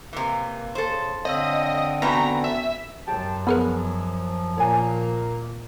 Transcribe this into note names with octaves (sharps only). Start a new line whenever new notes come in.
C3 E3 A#3
C#3 A4 C5
D3 C4 C#5 D#5 F5 E6
E3 A3 B3 C#4 F#4 B4 A#5
E5
F#2 G4 A5
F3 B3 G#4 A#4 B4 B5
A#2 A#3 C#5 G#5